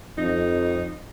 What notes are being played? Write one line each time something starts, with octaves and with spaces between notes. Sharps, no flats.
F2 D#4